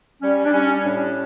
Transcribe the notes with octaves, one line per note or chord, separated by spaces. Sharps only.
G3 C#4
D4
G3 C#4
C#4
A2 D4